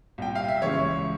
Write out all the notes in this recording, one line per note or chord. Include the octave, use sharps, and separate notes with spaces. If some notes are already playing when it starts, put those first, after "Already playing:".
C2 A#2 G5
F5
E5
C#2 C#3 E3 C#5